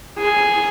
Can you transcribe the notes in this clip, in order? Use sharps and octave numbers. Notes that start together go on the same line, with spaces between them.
G#4